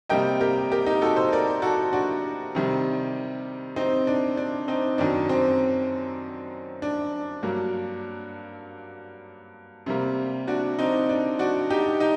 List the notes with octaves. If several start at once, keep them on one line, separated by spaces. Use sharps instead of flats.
C3 G3 A#3 D#5 G5
G4 A#4
G4 A#4
D#4 G4
F#4 A4
A4 C5
A#4 D5
F#4 A4
D4 F#4
C3 D#3 G3
C4 D#4
D4
D4
C4 D#4
F#2 D#3 F#3 D4
C4
D4
G2 F#3 A#3
C3 G3 A#3
D4 F#4
C4 D#4
D4
D4 F#4
D#4 G4
D#4 G4